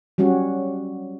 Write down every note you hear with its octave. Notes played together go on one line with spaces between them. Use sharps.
F#3 G3 C#4 F#4 G4